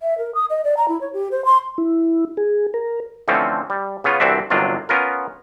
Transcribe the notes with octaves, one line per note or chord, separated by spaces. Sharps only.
E5
A#4
D#6
D#5
D5
A#5
E4
C#5
G4
C5
C6
E4
G#4
A#4
D3 E3 F3 A3 C4 C#4
G3
C#3 B3 C#4 F4
C2 E3 C4 D4 F#4 E5
G1 C3 D#3 F#3 D4 F4
B3 C#4 F4 A#4